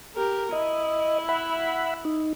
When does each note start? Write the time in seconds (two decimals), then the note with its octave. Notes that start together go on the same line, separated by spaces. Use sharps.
0.16 G4 A#4
0.52 E4 D#5
1.29 E5 F#5 B5
2.05 D#4